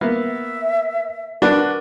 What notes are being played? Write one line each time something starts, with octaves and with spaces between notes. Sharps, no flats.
A#3 B3 E5
D4 F#4 A#4 B4